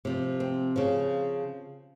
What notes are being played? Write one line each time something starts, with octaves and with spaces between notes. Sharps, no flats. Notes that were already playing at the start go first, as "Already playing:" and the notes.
C3 F3
C4
C#3 F3